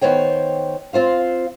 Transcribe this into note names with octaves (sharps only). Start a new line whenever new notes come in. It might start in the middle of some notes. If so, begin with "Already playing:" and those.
D#3 B3 C5 C#5 G5
C4 F4 C5 F5